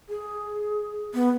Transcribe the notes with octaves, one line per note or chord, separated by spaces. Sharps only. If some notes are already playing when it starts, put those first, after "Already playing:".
G#4
B3